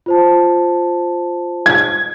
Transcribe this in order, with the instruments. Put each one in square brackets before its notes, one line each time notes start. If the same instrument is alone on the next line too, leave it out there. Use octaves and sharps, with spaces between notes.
[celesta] F4 C5 A5
[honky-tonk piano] G#6